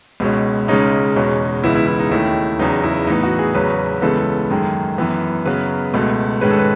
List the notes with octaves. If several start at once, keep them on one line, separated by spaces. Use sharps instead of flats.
C#2 B2 G#3 C#4
C#2 C#3 G#3 C#4 D#4
E2 B2 G#3 C#4
C#2 C#3 E3 B3 E4
E4
E4
D#4
D#2 D#3 A3 C#4 E4
E2 C#3 F#3 B3 D#4
E4
A2 E3 B3 D#4
F#4
G#4
E2 C#3 F#3 C#4 B4
C#2 C#3 E3 B3 A4
F#2 D#3 G#3
F#2 E3 B3
F#2 C#3 F#3 B3 B4
C#2 B2 A3
G#2 D#3 G#3 C#4 B4
A4
B4